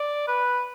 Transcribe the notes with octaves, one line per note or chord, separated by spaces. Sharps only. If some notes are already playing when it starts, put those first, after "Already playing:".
Already playing: D5
B4